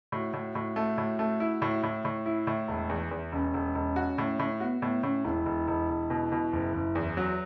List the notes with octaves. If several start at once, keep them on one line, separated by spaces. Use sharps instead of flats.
A2 F#4
A2
A2
A3
A2
A3
E4
A2
A2
A2
E4
A2
E1
E2
E2
E1 C#4
E1
E1
F#4
A2
A2
B3 F#4
A2 B3
A2 C#4
E1 E4
E1
E1
E1
B2
B2
F#1
F#1
E2
F#3 F#4